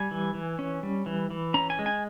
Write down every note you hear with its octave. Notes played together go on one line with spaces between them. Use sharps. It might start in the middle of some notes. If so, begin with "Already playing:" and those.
Already playing: G3 G#5
E3
E3
C#4
G3
E3
E3
C#4 A#5
G#5
G#3
G#5